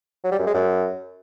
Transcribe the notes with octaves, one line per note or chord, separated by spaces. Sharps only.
F#3
G3
F#2
G#3
F#2